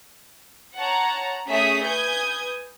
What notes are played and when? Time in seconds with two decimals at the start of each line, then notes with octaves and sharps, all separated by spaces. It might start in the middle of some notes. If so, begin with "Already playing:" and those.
0.78 C#5 F#5 A5 A#5
1.47 A3 C#4 G#4 E5 D#6 B6
1.84 B4 G#5 D#6 G6 G#6